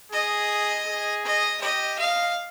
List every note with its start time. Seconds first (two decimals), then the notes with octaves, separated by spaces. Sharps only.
0.12 G#4 D#5
0.87 G#4
1.25 D#5
1.61 G4 D#5
1.99 D#5 F5